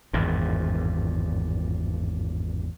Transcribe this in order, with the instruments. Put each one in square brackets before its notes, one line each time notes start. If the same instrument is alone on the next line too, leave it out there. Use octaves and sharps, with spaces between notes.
[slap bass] G#1 E2 G2 A#2